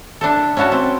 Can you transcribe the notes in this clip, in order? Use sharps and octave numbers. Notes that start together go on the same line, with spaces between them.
D4 E4 A4
C#4 E4 F#4 C#5 A5
C4